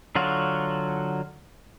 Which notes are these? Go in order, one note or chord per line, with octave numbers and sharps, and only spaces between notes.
D3 F#3 F4 F#4